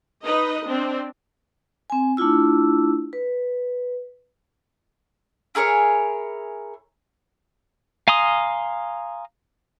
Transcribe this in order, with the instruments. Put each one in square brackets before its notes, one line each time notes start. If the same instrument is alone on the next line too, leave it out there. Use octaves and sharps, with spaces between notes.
[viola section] D#4 B4 D#5
C4 D4
[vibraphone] C4 G#5
A3 D4 E4 F4 E6
B4
[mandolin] E4 G#4 A#4 C#5
[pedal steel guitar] F5 G#5 A#5 C6 D#6